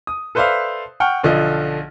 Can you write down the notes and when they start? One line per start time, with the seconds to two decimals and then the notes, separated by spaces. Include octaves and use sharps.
0.07 D#6
0.35 A4 B4 C5 D5 E5 F5
1.00 F#5 G5 C#6 F6
1.23 B1 D3 F3 D#5